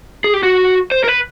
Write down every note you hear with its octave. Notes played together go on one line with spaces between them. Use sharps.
G#4
G4
F#4
C5
A#4
B4